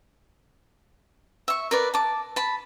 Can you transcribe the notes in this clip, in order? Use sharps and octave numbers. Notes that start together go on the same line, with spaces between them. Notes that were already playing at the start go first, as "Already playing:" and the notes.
E5 C#6
A#4 B4 D5
A5 D6
A5 B5